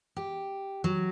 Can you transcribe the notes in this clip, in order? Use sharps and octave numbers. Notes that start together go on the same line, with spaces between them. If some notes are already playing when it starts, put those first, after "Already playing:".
G4
F#3